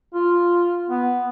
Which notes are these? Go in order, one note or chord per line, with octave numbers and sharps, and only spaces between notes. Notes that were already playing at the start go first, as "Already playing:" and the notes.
F4
B3